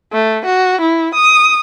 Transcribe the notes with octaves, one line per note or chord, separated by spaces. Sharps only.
A3
F#4
E4
D#6